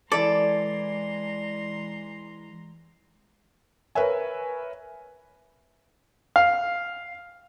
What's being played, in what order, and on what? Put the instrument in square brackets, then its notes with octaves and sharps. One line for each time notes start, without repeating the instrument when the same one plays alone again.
[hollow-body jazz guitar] E3 A4 [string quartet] G#3 A#5 C6 [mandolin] D5
[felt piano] A#4 B4 C#5 E5 G#5
[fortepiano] F5